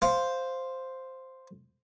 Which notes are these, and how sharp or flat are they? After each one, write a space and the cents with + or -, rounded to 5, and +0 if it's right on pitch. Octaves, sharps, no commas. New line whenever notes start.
C5 +0 F5 +0